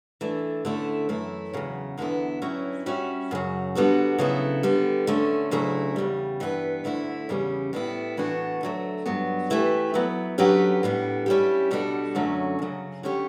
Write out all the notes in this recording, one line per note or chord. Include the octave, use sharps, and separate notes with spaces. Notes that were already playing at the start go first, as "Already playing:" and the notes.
E3 A3 D4
D3 A3 C#4 E4
F#2 E3 A3 E4
E2 C#3 F#3
E2 D3 F#3 B3 E4
G2 F#3 C#4 E4
G3 C#4 F#4 C#5 E5
F#2 C#3 F#3
D3 G3 B3 F#4 A4
C#3 F#3 B3 E4 A4
D3 G3 B3
D3 A3 C#4
D2 C#3 F#3 A3 E4
E2 C#3 G3
G2 E3 B3 E4 B4
D2 D3 A3 E4
E2 C#3 G3 C#4
A2 G3 B3 E4
A2 E3 B3 D4 F#4
D2 D3 F#3 A3
G2 F#3 B3
E3 A3 E4 G4 B4
F#3 B3 E4
D3 F#3 C#4 G4 B4
A2 G3 B3
G3 C#4 E4 G4
B2 G3 D4 F#4 A4
F#2 D3 F#3 A3 C#4
F#2 C#3 F#3
D3 F#3 C#4 G4 C#5